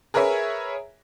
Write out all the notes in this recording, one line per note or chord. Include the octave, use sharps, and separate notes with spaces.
G#4 A#4 B4 C#5 E5 G#5